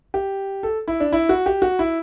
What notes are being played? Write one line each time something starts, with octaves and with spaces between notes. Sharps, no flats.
G4
A4
E4
D4
E4
F#4
G4
F#4
E4